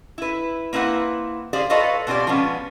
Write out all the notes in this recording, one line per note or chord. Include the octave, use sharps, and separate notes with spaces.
E4 B4
A#3 C4 E4 B4 F#5
G4 G#4 C5 D5 F5
F4 A4 B4 C#5 D#5 F5
B2 C4 F4 G4 D5
F3 G#3 B3 C#4